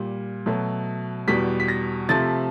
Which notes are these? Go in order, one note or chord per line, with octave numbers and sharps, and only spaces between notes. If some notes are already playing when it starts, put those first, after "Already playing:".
Already playing: A#2 G3
B2 F#3 A3
E2 B2 G3 B6
B6
A#6
C3 F3 A3 A6